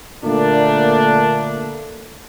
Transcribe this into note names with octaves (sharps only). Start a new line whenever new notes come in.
A#2 D3 A3 A#3 D4